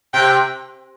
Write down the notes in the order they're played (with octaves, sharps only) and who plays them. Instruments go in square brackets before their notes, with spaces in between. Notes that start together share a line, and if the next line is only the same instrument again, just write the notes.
[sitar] C3 [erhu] G5